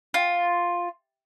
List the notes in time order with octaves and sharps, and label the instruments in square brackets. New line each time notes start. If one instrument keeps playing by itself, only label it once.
[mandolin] F4